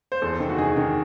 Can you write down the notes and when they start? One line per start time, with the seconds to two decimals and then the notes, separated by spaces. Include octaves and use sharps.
0.12 C5
0.22 E2 A4
0.40 D#3
0.50 F#4
0.58 D#3 G#4
0.76 D#3